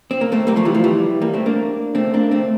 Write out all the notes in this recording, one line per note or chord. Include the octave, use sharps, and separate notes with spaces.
C4
A#3
A3 C4
G3 A#3
F3 A3
E3 G3
F3 A3
E3 G3
G3 A#3
A3 C4
A#3 D4
A3 C4
A#3 D4
A3 C4